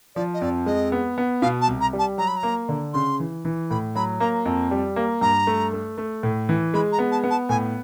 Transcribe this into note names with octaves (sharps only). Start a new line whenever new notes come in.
F3 D5
D#5
F2 D5
G#3 D#5
B3
B3
B2 F5
A5
C2
A#5
G3
A5
F#3 A#5
B5
A#5
A#3
D3
C#3 C6
E3
E3
A2 B5
F#3 B5
A#3 A#5
F2
G3
A#3
G2 A#5
A3
A3
A3
A2
E3
G#3 B5
A#5
B3
A5
B3
A5
A2 G#5